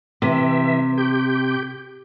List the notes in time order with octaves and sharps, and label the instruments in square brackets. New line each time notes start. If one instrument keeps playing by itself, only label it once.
[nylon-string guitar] C3 [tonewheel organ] E3 E5
[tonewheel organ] G4 G6